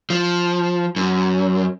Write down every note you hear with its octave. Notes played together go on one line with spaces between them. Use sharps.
F3
F#2